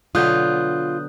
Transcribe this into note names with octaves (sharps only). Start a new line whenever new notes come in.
B2 D3 F#3 F4 D#6 F#6 G6